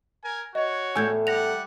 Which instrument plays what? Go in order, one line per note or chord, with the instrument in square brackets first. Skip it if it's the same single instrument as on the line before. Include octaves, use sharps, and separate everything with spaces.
[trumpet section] A#4 G#5
[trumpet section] F#4 C#5 [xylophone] D#5
[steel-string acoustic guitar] E2 A2 [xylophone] G#5 G6 G#6
[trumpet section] G3 F#5 [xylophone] A#6 F7